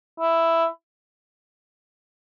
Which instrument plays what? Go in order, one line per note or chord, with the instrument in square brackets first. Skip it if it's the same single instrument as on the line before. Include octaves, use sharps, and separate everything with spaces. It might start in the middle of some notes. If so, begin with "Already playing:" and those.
[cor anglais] E4